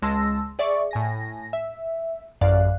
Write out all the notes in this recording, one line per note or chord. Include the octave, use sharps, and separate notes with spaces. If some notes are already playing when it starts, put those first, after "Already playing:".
C#2 G#3 A5 C6 E6 A#6
G#4 D5 E5 C#6
A2 G#5 A#6
E5
A1 F#2 D5 F5 F#6